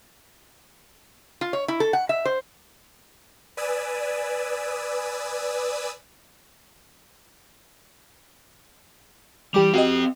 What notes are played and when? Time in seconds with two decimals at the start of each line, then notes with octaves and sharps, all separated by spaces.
1.41 F4
1.53 C#5
1.68 E4
1.80 A4
1.93 F#5
2.09 E5
2.25 C5
3.57 B4 D5 G#5 D#6 E6
9.54 E3 G3 G4 D6
9.74 C4 F#4 G4 D#5 F5